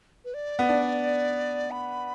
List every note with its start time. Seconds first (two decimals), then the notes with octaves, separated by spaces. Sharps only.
0.25 B4
0.34 D5
0.59 B3
0.69 D4
1.71 B5